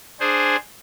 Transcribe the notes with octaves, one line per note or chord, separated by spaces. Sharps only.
D4 G#4 C5